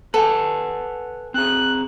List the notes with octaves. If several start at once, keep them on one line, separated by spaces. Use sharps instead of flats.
A4 B4 F#5 G#5
C4 G#4 F#6